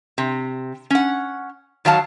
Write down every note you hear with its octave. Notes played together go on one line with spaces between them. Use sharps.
C3
C#4 F#5
D#3 F#3 F5 A5